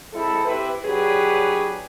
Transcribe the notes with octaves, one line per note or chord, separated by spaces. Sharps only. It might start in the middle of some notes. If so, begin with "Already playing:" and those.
G#3 C4 E4 A4
C4 E4 G4 B4
F#3 D4 G4 G#4 B4 C#5